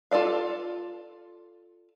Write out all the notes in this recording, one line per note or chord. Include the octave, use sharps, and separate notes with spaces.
F4 A4 D5 F5